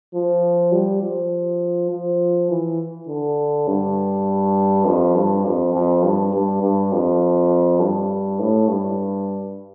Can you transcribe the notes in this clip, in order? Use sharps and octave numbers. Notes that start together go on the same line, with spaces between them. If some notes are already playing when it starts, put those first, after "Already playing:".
F3
G3
F3
F3
E3
D3
G2
F2
G2
F2
F2
G2
G2
G2
F2
G2
A2
G2